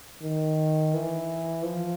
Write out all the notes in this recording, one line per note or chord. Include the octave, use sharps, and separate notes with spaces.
D#3
E3
F3